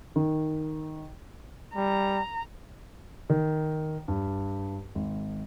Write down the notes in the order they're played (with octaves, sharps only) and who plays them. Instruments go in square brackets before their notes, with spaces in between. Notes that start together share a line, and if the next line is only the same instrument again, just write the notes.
[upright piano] D#3
[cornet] G3 [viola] A#5
[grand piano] D#3
G2
G#1